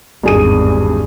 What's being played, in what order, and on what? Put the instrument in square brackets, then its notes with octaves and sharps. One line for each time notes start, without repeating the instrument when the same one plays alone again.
[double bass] G#1 E2 [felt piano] G2 G#4 D#7